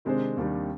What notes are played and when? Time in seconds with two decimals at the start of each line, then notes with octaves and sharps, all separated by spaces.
0.05 C3 D#3 G#3 D4 G#4 C5
0.37 D#2 D#3 G3 D4